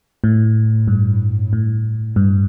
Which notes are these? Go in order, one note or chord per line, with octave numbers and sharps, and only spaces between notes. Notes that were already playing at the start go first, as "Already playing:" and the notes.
A2
G2
A2
G2